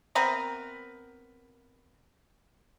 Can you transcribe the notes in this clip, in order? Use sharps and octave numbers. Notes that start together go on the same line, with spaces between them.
B3 C4 A#4 B4